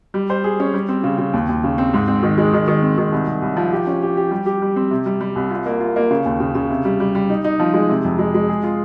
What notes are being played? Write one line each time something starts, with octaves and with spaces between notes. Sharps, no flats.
G3
C5
G#4
C#4
G3
C4
C#3
C#3
D#2
D#2
C#3
C4
G#2
C4
D#3
G#3
D#3
D#3
C4
D#3
C2
C2
C2
F3
G4
C#4
G4
G4
G3
G4
G3
C4
C3
G3
G3
C2
F4
A#3
F4
A#3
C#3
D#2
C#3
C#3
C3
G3
G3
G3
D#4
D#4
F3
G#3
C3
F2
G#3
G#3
G#4
F4